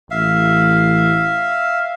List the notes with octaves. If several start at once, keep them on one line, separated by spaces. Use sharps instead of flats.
A1 E5 F5